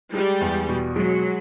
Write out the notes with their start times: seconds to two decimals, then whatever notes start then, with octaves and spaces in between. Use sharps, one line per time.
0.14 G3 G#3
0.41 E2
0.68 B2
0.95 F#3 G#3